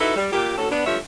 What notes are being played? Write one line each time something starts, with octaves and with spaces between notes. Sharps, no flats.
D#4 E4 F#4 A4 B4 E5
G3
A#2 G4
D2 A2 C#4 F#4 A4
B3 D4
G2 F3 A3 C#5 E5